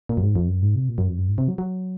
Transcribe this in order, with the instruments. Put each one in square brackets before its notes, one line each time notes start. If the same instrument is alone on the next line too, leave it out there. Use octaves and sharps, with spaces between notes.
[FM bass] A#2
F#2
G#2
F2
F#2
G#2
C3
A#2
F#2
F2
F#2
G#2
C3
F#3
F#3